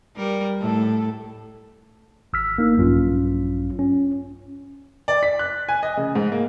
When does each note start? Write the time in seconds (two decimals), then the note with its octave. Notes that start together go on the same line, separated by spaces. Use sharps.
0.16 G3 A#4
0.61 A2 A4
2.33 G#1 E6 F6 B6
2.58 A#3 D#4
2.77 A#1 G2 F#3 C#4 F4
3.79 C#4
5.08 D5
5.23 B6
5.39 F#6
5.68 G#5
5.83 D#5
5.97 C#3
6.15 G#2
6.32 A#3